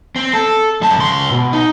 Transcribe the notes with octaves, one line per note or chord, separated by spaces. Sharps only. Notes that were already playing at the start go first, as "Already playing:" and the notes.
C4
A4
F#2 A5
C#2 C6
B2
D#4